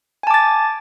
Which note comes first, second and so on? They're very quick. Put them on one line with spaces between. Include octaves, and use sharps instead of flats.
G#5 A5 D6 A6